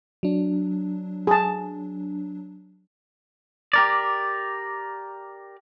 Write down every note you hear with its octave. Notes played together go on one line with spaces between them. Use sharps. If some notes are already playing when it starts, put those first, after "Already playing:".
F#3 D4
G#4 A5
G4 A#4 D5